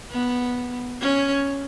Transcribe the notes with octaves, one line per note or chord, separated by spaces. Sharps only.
B3
C#4